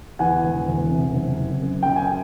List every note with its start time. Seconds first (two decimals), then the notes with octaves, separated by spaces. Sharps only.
0.19 E2 F#5 G#5
0.44 E1
0.68 E1
0.90 C3
1.14 F#1
1.38 F#1
1.62 F#2
1.83 F#2 G5
1.96 G#5